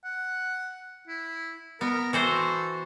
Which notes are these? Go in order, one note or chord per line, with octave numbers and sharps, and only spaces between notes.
F#5
E4
B3 A#4
E3 F#4 A4 C5